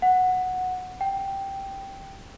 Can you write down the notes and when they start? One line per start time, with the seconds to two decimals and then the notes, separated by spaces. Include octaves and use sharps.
0.02 F#5
1.01 G5